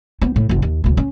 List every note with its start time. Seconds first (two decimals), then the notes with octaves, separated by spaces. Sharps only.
0.21 B3 C4
0.36 A2
0.49 F#1 F#2
0.62 D#2
0.84 D2 A#2
0.97 C#4